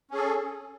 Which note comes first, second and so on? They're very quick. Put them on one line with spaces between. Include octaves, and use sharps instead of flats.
C#4 G#4 A4